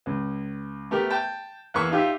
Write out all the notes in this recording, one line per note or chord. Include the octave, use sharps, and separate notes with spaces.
C#2
A3 B3 G4 A#4
G5 A5
E2 A#3 B4 E5 C#6
D#4 F4 G4 E5